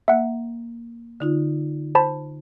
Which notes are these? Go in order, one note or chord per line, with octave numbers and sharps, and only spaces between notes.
A#3 E5 F#5
D3 D#4 F4
C5 A5 B5